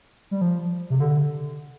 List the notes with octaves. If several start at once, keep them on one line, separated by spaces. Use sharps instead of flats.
G3
F3
C3
D3